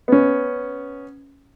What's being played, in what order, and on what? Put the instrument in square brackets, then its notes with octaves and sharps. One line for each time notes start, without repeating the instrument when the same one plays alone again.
[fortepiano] B3 C#4